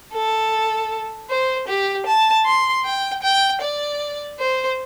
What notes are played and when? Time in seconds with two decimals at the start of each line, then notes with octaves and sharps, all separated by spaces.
0.13 A4
1.30 C5
1.68 G4
2.06 A5
2.46 C6
2.85 G5
3.22 G5
3.61 D5
4.39 C5